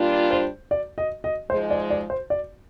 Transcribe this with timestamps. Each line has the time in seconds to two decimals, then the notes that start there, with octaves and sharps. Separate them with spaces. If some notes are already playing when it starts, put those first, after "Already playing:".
Already playing: A#2 G3 D4 F4
0.31 C5
0.71 D5
0.98 D#5
1.24 D#5
1.50 G#2 F3 G#3 C5
1.70 D5
1.90 D5
2.10 C5
2.30 D5